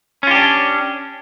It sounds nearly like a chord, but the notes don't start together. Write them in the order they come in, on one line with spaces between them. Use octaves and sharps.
C#4 F4 G4 D4